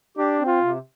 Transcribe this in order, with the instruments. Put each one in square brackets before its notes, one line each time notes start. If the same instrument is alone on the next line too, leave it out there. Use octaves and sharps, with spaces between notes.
[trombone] D4 [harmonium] G4
[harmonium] C4
[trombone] F4
[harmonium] C3